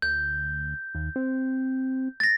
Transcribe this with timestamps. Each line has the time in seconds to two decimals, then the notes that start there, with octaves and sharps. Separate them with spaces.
0.02 D2 G6
0.95 D#2
1.16 C4
2.20 A6 A#6